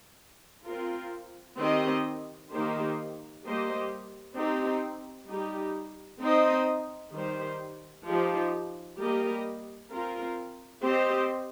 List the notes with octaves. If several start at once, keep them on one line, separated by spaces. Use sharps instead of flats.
C4 F4 A#4
D#3 C4 G4 D#5
D#3 A#3 D#4 G4 C5
G3 A#3 G4 C5 D#5
C4 D#4 G4
G3 D#4 G4
C4 D#4 C5 D#5
D#3 G3 D#4 G4 C5
F3 D#4 G4
G3 A#3 G4 A#4 D#5
C4 F4 A#4
C4 G4 C5 D#5